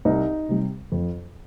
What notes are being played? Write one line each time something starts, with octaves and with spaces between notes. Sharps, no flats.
C2 D#4
C3 G3
F2